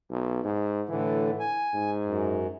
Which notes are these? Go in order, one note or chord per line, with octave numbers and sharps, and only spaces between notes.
B1
G#2
A2 D3 E3
G#5
G#2
F#2